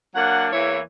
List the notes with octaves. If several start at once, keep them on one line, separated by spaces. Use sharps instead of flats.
F#3 A#3 D4 F#5
E2 E3 A#3 E4 C#5